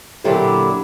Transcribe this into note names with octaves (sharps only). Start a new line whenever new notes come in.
A#2 D3 F#3 D4 E4 G4